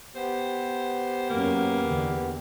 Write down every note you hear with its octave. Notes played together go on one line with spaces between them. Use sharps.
B3 G4 C5
F#2 A#3
E2 D3